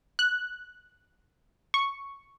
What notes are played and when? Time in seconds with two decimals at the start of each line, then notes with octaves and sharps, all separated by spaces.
0.19 F#6
1.74 C#6